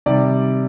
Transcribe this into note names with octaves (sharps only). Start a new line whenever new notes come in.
C3 D#3 G3 D5